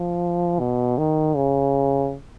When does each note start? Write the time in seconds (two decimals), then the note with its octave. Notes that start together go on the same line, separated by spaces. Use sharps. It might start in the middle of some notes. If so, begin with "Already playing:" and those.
Already playing: F3
0.59 B2
0.98 D#3
1.36 C#3